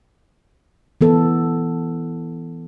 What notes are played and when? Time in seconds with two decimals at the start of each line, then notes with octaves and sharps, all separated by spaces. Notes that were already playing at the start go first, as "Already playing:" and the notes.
1.01 E3 B3 A4